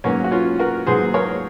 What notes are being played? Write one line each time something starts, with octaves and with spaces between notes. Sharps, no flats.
G#2 F#3 A#3 C#4
F#4
C#4 F4
F#4 A#4
G#2 F#3 G#4 C5
A#4 C#5